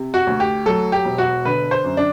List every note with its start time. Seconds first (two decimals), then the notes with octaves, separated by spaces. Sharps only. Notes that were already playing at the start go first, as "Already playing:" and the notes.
Already playing: C3
0.14 F#4
0.27 D2
0.40 G4
0.66 F#3 A4
0.92 G4
1.05 E1
1.18 F#4
1.45 D3 B4
1.71 C5
1.84 F#2
1.97 D4